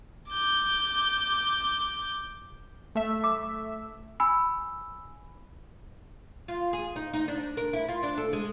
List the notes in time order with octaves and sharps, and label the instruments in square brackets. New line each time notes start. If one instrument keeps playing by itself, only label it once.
[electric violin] D6 G6
[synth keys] A3 E5
[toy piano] D6
[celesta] G#5 B5 E6
[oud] F4
G#4
D#4
D#4
D4
A#4
E4
F4
D4
A4
G#3